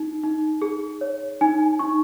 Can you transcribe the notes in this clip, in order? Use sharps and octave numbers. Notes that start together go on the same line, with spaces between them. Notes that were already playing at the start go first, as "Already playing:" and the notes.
Already playing: D#4
D#4
G#4
C#5
D#4 G#5
D#4 C#6